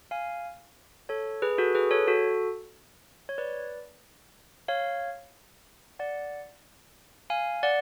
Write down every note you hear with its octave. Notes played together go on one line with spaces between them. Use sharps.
F5 G#5
A4 C#5
G#4 B4
F#4 A4
G#4 B4
A4 C#5
F#4 A4
C#5
B4 D5
C#5 F5
D5 F#5
F5 G#5
D5 F#5